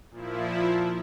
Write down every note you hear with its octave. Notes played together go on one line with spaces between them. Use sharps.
A#2 F3 E4